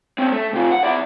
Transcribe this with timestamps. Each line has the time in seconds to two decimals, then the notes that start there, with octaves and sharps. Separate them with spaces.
0.18 C4 C#4
0.32 A3
0.53 C3 F4
0.71 F#5
0.84 E4 D5